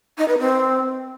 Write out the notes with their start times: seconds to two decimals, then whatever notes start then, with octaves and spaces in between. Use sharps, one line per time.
0.18 D#4
0.28 B4
0.39 C4